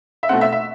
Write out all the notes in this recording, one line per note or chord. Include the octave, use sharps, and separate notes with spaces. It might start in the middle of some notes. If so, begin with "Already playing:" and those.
E5
B2 A3 C4 F#5
E5
E5